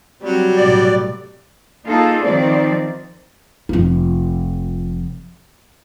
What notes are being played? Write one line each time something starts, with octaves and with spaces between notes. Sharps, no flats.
F#3 G3 C4
B1 A2 C3 D5
A#3 D#4 F4 G#4 A4
D#3 F3 C4 D5
F1 F3